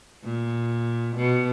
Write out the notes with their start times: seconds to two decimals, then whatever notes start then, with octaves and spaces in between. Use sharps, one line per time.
0.24 A#2
1.16 B2